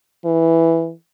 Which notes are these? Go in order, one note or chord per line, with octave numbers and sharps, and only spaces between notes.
E3